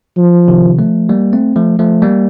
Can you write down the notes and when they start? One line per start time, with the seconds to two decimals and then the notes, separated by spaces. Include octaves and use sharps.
0.17 F3
0.48 C3 D#3
0.79 F3 A3
1.09 G3 A#3
1.33 A3 C4
1.56 F3 A3
1.79 F3 A3
2.02 G3 A#3